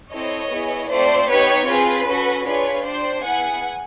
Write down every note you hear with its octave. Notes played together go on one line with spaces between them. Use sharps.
C4 E4 A4 C#5 D#5
B3 E4 G#4
A3 C4 F4 C5 D5
B3 D#4 G4 B4 C#5
C4 F4 G#4 B4
C#4 F#4 A4
D4 F4 G#4 B4 C#5
D4 G4 C5 D5
B3 E4 G#4 F#5 G#5